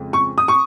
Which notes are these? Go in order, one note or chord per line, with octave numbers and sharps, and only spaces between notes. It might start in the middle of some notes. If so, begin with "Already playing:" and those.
Already playing: F2 C#3 F3 G#3
C#6
D#6
C#6